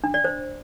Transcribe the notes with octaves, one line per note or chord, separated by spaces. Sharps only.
D4
D5
C5